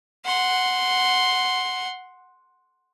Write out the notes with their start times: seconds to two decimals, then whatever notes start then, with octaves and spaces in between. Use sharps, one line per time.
0.25 F#5 C6